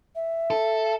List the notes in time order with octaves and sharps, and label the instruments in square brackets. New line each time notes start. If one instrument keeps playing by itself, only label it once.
[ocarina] E5
[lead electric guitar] A4